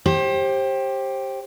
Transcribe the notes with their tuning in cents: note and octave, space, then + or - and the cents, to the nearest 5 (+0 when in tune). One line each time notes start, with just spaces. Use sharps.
G4 +0 C5 +30